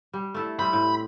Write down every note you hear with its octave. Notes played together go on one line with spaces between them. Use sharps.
G3
A3 E4 A4
G3 C4 B5
A2